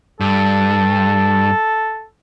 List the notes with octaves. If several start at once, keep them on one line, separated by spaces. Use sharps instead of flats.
G2 A4